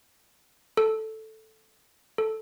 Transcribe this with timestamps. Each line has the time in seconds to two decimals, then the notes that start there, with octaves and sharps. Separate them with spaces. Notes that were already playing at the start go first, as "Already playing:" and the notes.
0.77 A4
2.18 A4